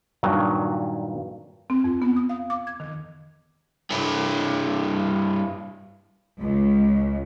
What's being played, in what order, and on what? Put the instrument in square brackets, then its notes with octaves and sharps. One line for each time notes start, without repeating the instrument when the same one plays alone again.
[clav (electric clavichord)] G2 A#2 D#3 F#3
[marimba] C4
F2
B3
D#6
F5
D6
G#6
D#3
[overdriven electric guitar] G2 E4
[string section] C#2